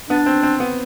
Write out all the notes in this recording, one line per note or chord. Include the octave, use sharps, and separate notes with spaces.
B3 D4
C4
C4
B3